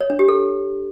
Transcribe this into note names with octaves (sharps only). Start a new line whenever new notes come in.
C#5
D4
G4
A4